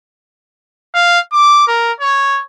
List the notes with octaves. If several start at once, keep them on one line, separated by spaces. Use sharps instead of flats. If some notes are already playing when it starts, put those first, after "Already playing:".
F5
D6
A#4
C#5